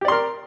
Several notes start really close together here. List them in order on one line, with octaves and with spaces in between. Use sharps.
G4 D5 C6 A#4